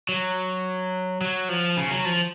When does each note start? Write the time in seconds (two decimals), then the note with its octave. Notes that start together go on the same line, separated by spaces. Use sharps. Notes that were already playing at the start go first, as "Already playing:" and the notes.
0.09 F#3
1.21 F#3
1.49 F3
1.77 C#3
1.91 F#3
2.05 F3